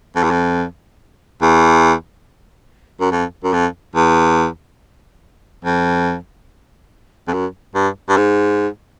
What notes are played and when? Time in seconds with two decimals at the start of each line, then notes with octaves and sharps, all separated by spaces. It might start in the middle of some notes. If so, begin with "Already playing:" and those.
0.16 F2
0.23 E2
0.31 F2
1.42 E2
3.01 F#2
3.12 F2
3.44 F#2
3.53 F2
3.95 E2
5.65 F2
7.28 F2
7.33 F#2
7.75 G2
8.09 G2
8.17 G#2